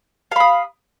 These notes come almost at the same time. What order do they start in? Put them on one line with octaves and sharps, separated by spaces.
F5 B5 D#6